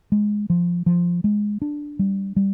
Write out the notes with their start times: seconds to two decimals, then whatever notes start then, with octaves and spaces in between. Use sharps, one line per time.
0.12 G#3
0.50 F3
0.86 F3
1.24 G#3
1.62 D4
1.99 G3
2.36 G3